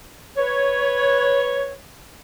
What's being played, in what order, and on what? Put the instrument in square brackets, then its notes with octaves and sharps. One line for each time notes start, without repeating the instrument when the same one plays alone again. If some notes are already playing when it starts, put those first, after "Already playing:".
[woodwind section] B4 C#5